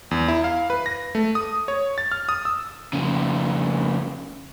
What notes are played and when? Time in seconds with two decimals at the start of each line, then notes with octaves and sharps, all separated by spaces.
0.11 E2
0.28 E4
0.44 F5
0.70 B4
0.86 A#6
1.15 A3
1.35 D#6
1.68 C#5
1.98 A6
2.12 F6
2.29 D#6
2.45 E6
2.93 F2 C#3